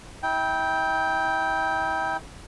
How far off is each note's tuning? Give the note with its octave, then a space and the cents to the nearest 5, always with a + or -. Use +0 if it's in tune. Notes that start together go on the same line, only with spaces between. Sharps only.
E4 -40 G5 +0